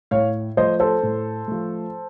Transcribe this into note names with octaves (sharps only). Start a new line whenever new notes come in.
A2 C#5 F5
F3 A3 C5 D#5
A4 C5
A2
F3 A3